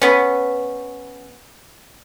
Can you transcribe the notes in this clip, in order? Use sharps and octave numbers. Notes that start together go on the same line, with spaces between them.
B3 C#4